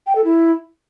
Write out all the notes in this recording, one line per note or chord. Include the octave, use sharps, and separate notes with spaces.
G5
A4
E4